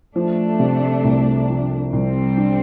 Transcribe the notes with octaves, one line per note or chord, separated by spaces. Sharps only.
F3 A3 D4
C3
C2
F3
C2 G3 C4
D4